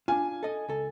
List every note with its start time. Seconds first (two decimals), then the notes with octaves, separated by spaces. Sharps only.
0.08 D4 F4 G#5
0.43 A4 D#5
0.69 C#2 A4